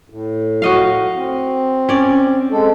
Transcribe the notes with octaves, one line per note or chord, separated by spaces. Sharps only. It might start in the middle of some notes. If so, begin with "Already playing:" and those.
A2
F#4 D#5 F5
C4
C#4 D5
G#3 C4 A4